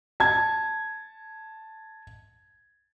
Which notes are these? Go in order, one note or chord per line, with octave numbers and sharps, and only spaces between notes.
A5 G#6